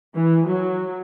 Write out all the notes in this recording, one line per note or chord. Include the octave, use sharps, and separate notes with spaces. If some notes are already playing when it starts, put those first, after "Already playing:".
E3
F#3